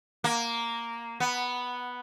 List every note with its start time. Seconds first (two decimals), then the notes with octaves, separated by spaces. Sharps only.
0.24 A#3
1.20 B3